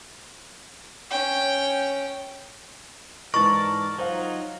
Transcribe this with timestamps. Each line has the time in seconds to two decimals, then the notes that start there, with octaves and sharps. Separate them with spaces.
1.11 C#4 G5
3.34 G#2 E3 A#4 D5 D#5 A5 C#6
3.98 F#3 D#4 F4 C5 F5